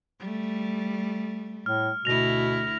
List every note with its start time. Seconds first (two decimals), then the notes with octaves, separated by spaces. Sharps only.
0.20 G3 A3
1.66 A2 F6
2.05 D2 B2 E4 A#6 F7